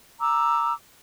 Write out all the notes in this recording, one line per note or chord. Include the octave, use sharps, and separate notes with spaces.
A#5 D6 E6